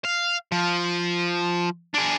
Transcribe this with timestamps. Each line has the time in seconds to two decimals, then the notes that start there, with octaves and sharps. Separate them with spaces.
0.05 F5
0.52 F3
1.94 D4 G#4